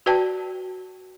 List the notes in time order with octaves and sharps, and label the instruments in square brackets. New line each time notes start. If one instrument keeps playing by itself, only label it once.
[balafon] F#4 B4 D5 G5 A5